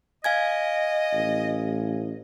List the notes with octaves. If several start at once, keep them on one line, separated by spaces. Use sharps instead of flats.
D#5 F5 G#5 G#6
A1